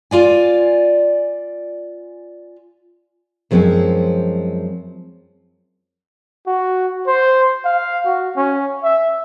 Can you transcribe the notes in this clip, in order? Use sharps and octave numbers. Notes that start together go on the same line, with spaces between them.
F4 D5 G#5
F#2 F3 G#3 A#3 C4 C#4
F#4
C5
F5
F#4
C#4
E5